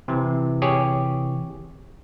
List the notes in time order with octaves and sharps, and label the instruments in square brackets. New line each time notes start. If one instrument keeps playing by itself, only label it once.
[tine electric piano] C3 E3
[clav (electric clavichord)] G4 G#4 C#5